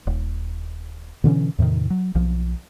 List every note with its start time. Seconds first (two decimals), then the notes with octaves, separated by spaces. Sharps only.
0.07 D#1
1.24 B2 D3 E3 C#4
1.58 E2 A2 C3 D#3
1.90 F#3
2.15 B1 F3